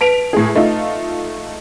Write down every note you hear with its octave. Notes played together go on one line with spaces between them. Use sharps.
B4 A5 B6 D7 F7
A2 G#4
A3 D#4 F4